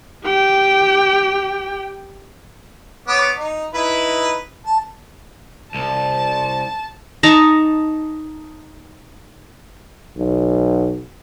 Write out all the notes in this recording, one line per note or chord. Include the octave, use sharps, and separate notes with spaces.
G4 G5
B3 C#5 D6
D#4
D#4 E4 B4
A5
C2 A5
D#4 A5 A#5 C#6
B1